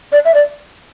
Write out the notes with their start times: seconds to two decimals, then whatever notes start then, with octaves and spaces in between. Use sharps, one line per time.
0.12 D5
0.25 E5
0.34 D5